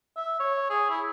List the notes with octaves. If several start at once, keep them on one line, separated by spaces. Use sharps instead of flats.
E5
C#5
G#4
E4